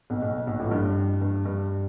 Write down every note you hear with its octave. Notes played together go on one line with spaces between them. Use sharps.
B1 B2
B1 B2
B1 B2
A1 A2
G2
G2
G2